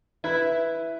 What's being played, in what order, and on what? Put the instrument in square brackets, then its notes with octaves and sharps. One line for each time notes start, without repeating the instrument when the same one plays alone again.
[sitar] E4 [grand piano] B4